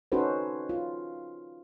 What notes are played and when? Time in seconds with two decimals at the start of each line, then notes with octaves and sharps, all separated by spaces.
0.12 C#4 D#4 F#4 A4 B4 C5
0.69 F4